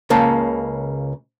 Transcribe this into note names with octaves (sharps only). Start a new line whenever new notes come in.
C#2 C#3 A#3 A5